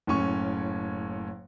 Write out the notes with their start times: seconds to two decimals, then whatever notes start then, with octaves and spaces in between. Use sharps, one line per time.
0.07 F#1 A2 C#4 C#6